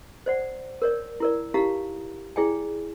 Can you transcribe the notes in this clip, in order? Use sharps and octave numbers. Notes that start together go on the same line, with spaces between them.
C5 D5 F#5
A#4 C#5 D5
E4 A#4 D5
D#4 E4 G4 F5 A#5
E4 G#4 D5 G5 G#5